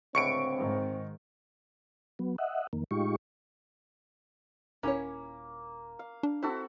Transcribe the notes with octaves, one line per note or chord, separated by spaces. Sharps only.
C#2 A2 D3 C4 C#6 C#7 D7
G#2 D#3
F#3 B3
D#5 E5 F#5
F2 D#3 A#3
A2 G#3 D#4 F4 G4 C#6
D#1 A#3 C#4 E4 C#5
F5
D4
C4 E4 F#4 A4